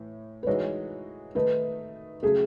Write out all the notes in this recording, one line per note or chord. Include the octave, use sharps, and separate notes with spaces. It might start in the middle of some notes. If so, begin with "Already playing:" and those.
Already playing: A2 E3
B4
E3 G#3 D#4 F#4 C#5
D#3 A3 D#4 B4
C#3 F#3 A3 G#4